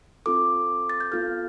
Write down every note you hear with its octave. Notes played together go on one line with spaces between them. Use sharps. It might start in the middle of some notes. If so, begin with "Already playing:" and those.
C4 F4 A4 D6
A6
G6
B3 F4 A4 F6